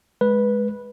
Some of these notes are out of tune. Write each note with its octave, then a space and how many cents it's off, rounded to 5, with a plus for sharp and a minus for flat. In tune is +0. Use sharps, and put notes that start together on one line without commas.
G#3 +10 B4 -10